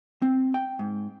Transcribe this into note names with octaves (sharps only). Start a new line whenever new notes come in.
C4
G5
G#2